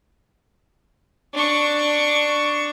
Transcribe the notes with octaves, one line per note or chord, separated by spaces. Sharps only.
D4 C#6